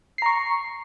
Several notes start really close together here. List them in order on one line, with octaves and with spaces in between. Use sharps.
C7 A#5 C#6